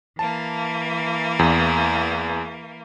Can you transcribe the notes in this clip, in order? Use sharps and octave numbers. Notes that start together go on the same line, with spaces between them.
E3 A#3 A5
E2